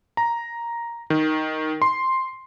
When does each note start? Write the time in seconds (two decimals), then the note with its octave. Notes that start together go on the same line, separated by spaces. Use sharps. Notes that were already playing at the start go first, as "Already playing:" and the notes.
0.17 A#5
1.10 D#3
1.82 C6